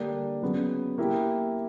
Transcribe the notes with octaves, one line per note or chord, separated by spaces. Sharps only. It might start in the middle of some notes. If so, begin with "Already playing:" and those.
Already playing: D3 G3 A#3 D4
C#3 F#3 B3
A#3 E4 G4